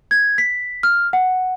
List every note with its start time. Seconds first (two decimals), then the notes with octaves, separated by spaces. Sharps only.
0.11 G#6
0.38 B6
0.83 F6
1.13 F#5